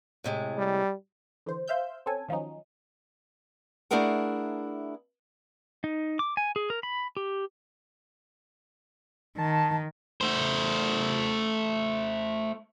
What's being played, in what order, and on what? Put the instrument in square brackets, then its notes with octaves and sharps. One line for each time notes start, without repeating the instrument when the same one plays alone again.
[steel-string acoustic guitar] A2 C3 G#3
[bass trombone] G3
[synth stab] D3 E3 C5
C5 E5 F5 E6 G6
C4 C#4 A4 G#5
D#3 F3 F#3 C#4 D#4
[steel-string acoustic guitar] A3 D4 E4 G#4 A#4 F#5
[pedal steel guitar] D#4
D6
G#5
G#4
A#4
B5
G4
[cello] D#3 [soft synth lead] A5
[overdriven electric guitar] A3 C5